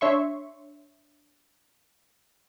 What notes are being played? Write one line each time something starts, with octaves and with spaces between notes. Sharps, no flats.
D4 C#5 E5 C6 C#6